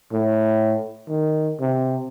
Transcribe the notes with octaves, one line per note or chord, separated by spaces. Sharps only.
A2
D#3
C3